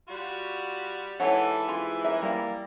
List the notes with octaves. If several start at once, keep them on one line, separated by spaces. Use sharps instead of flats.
G3 F4 F#4
G#2 C3 E3 A4 C#5 F#5
F4 G#4
A#4 E5
G3 A#3 E4